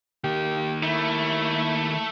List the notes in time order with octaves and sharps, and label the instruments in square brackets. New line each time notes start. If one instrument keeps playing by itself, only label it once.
[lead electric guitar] D#3 A#3 [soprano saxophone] G4
[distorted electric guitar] A3 [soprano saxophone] E4